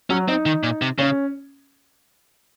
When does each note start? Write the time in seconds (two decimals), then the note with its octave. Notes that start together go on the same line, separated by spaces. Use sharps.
0.10 F#3 C#4
0.28 C4 D#4
0.46 D#3
0.63 A#2
0.82 C3
0.98 C#3 C#4